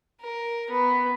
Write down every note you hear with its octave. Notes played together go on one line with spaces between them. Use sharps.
A#4
B3